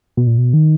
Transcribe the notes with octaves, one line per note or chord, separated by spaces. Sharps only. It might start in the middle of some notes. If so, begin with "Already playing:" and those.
B2
A#2
B2
D#3